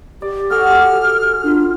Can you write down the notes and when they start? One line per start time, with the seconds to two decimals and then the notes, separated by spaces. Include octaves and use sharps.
0.22 G4 D5
0.51 F#4 G#4 A4 F#5 F6
1.43 D4 F4